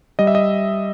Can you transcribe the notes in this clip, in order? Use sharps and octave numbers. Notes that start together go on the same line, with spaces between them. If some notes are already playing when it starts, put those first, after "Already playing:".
G3 D#5
E5
D#5